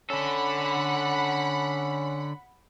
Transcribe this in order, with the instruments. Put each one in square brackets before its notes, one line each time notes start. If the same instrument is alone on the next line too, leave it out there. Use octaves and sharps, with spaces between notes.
[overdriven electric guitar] D3 A4 [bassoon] C#4 [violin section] F#5 B5